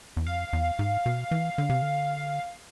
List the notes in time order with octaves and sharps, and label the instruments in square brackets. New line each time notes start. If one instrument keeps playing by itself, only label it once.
[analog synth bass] E2
[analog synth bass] F2 [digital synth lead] F5
[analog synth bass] E2
G#2
B2
E3
D3
C3
D3